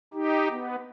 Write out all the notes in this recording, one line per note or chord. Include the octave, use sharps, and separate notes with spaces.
D#4 G4
B3